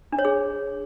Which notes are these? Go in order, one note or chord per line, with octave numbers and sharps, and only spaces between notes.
D4
C#5
G#4